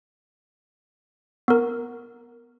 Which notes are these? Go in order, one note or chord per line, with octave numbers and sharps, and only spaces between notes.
B3 A#4